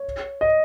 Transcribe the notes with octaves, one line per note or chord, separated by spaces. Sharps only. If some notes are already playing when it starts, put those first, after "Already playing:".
Already playing: C#5
D#5